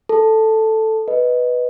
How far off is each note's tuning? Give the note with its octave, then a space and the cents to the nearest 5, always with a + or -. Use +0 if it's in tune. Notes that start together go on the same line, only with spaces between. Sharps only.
A4 +0 A5 +0
B4 +0 D#5 +0